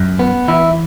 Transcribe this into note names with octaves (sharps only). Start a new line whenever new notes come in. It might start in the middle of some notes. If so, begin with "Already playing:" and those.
Already playing: F#2
B3
E3 E4